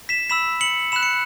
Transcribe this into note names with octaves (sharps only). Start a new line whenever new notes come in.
B6 E7
B5 E6 B6 E7
C#7 F#7
B5 F#6 E7
C#7